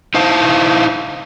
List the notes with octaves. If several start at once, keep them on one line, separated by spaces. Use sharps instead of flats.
D#4 E4 C5 F5 A5